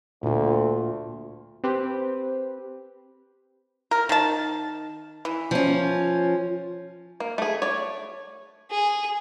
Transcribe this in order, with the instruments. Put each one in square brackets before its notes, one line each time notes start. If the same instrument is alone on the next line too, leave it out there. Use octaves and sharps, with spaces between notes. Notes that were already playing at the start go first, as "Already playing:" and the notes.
[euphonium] D2 [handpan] A#2 F4
[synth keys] C4 G4 B4 C5
[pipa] A#4
D#3 A5
E3
[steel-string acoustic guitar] F3 C#4
[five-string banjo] A#3
A3 G#4
C#5 D5
[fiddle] G#4